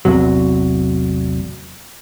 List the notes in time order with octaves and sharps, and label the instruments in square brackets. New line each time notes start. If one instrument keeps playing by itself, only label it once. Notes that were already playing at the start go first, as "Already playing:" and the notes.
[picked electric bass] A1 E2 C3 F#3